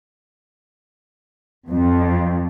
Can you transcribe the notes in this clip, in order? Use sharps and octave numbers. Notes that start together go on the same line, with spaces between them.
F2